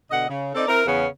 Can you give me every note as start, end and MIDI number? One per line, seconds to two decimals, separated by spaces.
0.11 0.26 47
0.11 0.26 50
0.11 0.26 75
0.11 0.26 78
0.27 0.50 49
0.54 0.68 60
0.54 0.68 63
0.54 0.68 69
0.54 0.68 74
0.68 0.82 60
0.68 0.82 64
0.68 0.82 70
0.86 1.05 40
0.86 1.05 49
0.86 1.05 59
0.86 1.05 61